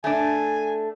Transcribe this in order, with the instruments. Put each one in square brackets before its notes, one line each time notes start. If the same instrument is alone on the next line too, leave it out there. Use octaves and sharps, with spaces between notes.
[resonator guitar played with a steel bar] A3 D4 [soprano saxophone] G#5